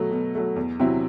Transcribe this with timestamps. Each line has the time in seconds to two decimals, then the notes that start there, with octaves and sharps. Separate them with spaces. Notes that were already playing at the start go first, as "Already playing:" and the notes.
Already playing: B2 F#3 A3
0.11 B2
0.35 F#3 A3
0.56 E2
0.80 C3 F#3 C4 E4